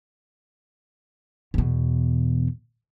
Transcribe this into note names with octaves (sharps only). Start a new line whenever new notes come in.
E2 B2